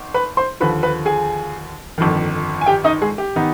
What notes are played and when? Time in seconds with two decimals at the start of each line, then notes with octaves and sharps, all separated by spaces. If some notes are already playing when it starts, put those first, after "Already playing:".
Already playing: G#1
0.14 B4 B5
0.37 C5 C6
0.60 D#2 D3 F3 B4 B5
0.83 B4 B5
1.06 G#4 G#5
1.98 G1 F2 D#3
2.61 G#5
2.66 G4 G5
2.84 D#4 D#5
3.02 G#3 G#4
3.18 G4
3.36 D#3 B3 D#4